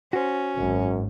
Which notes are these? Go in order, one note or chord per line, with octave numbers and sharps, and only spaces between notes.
C#4 F#4 C5
G#1 F#2